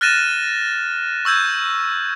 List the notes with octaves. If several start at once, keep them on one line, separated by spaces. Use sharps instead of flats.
F6 F#6 A6 A#6 D#7 E7
C#6 E6 G6 G#6